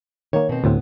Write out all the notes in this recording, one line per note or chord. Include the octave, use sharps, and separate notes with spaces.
D#3 A#3 C#5
B2 C4
D2 A2 B3 C4